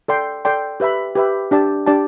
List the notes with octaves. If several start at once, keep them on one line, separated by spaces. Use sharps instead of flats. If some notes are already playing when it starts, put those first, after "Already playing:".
A4 D5 G5 C6
A4 D5 G5 C6
G4 B4 E5 B5
G4 B4 E5 B5
D4 G4 D5 A5
D4 G4 D5 A5